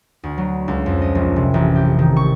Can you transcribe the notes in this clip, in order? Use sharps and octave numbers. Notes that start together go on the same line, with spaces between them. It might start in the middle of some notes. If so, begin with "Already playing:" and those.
D2
F#3
C#2
F2
D#5
A#1
C3
A1
G4
D#3
C#6